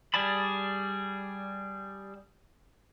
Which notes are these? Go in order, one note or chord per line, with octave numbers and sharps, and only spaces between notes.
G3 G#4 D5 A5 B5